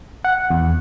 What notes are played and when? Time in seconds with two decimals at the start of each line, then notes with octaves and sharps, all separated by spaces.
0.24 F#5
0.50 E2